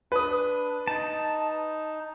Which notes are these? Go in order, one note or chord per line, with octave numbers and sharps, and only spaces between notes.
D4 B4 D#6
D#4 A5